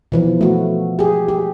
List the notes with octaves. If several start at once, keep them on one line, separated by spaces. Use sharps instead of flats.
B2 E3 F3
A3 F#4
G4 G#4
G4